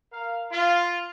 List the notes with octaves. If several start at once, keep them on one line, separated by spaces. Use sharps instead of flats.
A#4 F5
F4